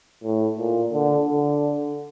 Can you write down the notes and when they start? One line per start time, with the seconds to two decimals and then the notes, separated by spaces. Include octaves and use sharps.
0.24 A2
0.58 A#2
0.93 D3
1.27 D3